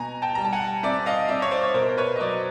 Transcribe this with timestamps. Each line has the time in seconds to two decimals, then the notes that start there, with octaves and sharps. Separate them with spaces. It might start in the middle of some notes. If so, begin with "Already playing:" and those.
Already playing: B2 G#5 A#5
0.22 G5 A5
0.35 G3 A#5
0.44 A5
0.53 F#5 G#5
0.83 C4 D5 E5
1.06 D#5 F5
1.28 C4 D5 E5
1.42 C#5
1.51 C5 D5
1.63 C#5
1.74 B2 A#4 C5
1.88 C5
1.97 B4 C#5
2.16 D#5
2.20 F#3 C5 D5